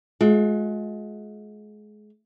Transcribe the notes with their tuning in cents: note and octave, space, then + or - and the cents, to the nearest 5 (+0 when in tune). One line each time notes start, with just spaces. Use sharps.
G#3 +30 F4 +45